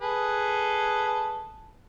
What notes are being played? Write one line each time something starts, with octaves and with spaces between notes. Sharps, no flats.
G#4 A4 B4